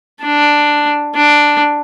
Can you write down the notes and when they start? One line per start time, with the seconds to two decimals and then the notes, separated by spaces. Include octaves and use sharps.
0.22 D4
1.15 D4